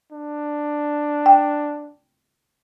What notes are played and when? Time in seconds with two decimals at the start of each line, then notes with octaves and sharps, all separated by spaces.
0.12 D4
1.26 G5